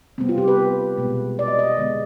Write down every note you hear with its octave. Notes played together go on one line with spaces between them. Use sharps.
C3 G3 B3 C4
F4
G4
B4
B2 G#3 B3
D5
D#5
D#5
D3 G#3 B3